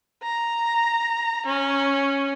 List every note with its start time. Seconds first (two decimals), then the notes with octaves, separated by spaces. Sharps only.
0.23 A#5
1.46 C#4